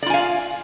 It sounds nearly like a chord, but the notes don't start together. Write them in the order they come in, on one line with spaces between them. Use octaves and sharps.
D5 F4 G#5 F5